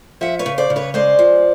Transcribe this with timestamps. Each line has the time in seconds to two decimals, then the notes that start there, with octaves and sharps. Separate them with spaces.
0.21 F3 E5 F#5
0.39 B4 C#5
0.46 C#3
0.58 C5 D5
0.70 C#3
0.76 B4 C#5
0.94 G#3 C5 D5
1.19 F3